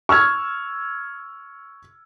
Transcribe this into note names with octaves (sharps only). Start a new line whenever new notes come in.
C#6 E6 F6 G#6